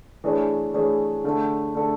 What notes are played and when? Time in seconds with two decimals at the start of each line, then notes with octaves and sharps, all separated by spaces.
0.24 E3 A3 D4 G#4 C#5
0.74 E3 A3 D4 G#4 C#5
1.24 D3 A3 D4 A4
1.75 D3 A3 D4 A4